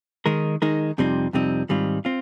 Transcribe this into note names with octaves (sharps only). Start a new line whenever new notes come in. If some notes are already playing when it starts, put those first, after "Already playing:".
D#3 G#3 D#4 A#4
D#3 G#3 D#4 A#4
F2 C3 G3 C4 D#4
F2 C3 G3 C4 D#4
G#2 D#3 G3 C4 F4
C4 F4